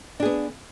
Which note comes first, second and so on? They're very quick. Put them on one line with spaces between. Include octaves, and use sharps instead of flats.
D4 G#4 B3